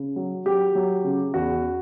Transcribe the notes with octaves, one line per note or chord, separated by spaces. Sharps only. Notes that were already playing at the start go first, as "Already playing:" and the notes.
Already playing: C#3
F#3
F#3 G4
F#3
C#3
E2 F#4